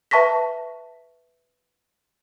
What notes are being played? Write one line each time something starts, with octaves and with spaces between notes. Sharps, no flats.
B4 E5 A5 C#6 A#6 B6